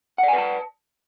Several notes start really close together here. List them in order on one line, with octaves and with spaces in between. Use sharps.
F#5 D5 G#5 B4 A5